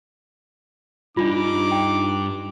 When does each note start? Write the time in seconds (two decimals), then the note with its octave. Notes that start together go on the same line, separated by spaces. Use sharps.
1.17 G2 G3 D4 D#4 F4 D6
1.71 G5